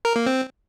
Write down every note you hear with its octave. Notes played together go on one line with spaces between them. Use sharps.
A#4
A#3
C4